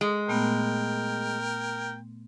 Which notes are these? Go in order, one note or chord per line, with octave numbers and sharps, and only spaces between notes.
G#3
A#2 A3 B3 A#4 G5